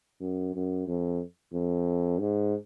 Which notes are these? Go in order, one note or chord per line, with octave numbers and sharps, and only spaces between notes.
F#2
F#2
F2
F2
G#2